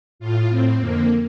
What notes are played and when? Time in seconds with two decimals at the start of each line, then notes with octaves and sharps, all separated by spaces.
0.19 A2 F4
0.49 A2 C4
0.78 F2 D3 A#3